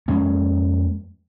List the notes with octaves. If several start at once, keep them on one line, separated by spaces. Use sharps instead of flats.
F2 G#3 A#3 C#4